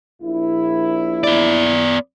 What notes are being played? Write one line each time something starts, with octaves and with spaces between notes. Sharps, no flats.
A#1 E4
B3 D5